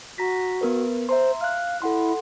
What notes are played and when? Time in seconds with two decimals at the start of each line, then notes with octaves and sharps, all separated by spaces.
0.18 F#4 A#5 A#6 B6
0.61 B3 A#4 B4
1.09 C5 E5 A#5 C6
1.41 F5 F6 F#6
1.82 E4 A4 F#5 C6